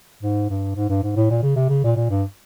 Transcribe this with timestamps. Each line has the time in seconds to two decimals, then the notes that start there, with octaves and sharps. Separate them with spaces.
0.23 G#2
0.50 G2
0.76 G#2
0.89 G2
1.03 G#2
1.16 A2
1.30 A#2
1.43 C#3
1.56 C3
1.69 C#3
1.84 A#2
1.96 A#2
2.10 G2